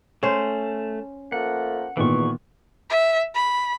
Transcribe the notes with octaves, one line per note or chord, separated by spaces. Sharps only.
A3 C#4 C5
F3 A3 A#3 F#5
E2 A#2 D#3 E3 B3 C#6
E5
B5